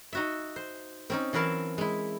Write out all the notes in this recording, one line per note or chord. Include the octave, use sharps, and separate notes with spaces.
D#4 F#4 E5
C5
C4 C#4 D#4
E3 F#3 E4 A#4 F5 A5
G#3 E4